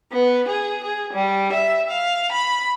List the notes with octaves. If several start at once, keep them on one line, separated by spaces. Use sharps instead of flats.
B3
G#4
G#4
G3
E5
F5
B5